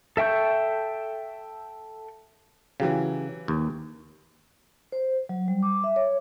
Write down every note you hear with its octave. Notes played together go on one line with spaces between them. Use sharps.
A4 E5 G5 C#6 G6
C#3 E3 F#3 G4
D#2
C5
F#3
G3
D6
E5
C#5